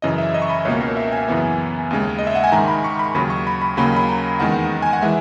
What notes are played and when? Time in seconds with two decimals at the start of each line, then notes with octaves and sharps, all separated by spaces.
0.02 F#2 C#3 E3 D#5
0.18 E5
0.34 D#5
0.42 C#6
0.49 B5
0.65 C#2 B2 A#3 C#4 C#5
0.80 A#4
0.97 E5
1.12 G#5
1.28 F#2 C#3 E3 B3
1.91 D#2 C#3 G#3
2.19 D#5
2.27 E5
2.35 F#5
2.44 G#5
2.52 G#2 D#3 G#3 A#5
2.68 B5
2.84 C#6
2.99 B5
3.15 D#2 C#3 F#3 B5
3.30 C#6
3.47 B5
3.61 B5
3.77 D#2 C#3 F#3 A#3 C#4 B5
3.96 B5
4.09 A#5
4.39 E2 D#3 G#3 F#5
4.82 G#5
4.93 F#5
5.02 E3 G#3 E5